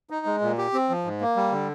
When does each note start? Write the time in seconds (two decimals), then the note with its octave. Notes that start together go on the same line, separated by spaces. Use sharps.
0.10 D#4
0.26 G#3
0.41 A#2
0.58 G4
0.73 C4
0.89 F3
1.04 G#2
1.21 A#3
1.36 G3
1.52 D3